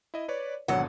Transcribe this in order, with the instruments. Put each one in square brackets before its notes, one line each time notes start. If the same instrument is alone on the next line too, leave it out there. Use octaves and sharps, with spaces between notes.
[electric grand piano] E4 D#5
B4 C#5 D5
[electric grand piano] G#1 B2 D3 [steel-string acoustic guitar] F#3 F#5